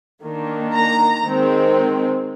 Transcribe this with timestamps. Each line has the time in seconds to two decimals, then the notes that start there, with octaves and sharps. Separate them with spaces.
0.23 D#3 A#3 D4
0.74 A#5
1.26 D#3 G#3 C4